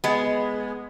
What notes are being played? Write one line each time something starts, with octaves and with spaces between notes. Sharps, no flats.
G#3 B3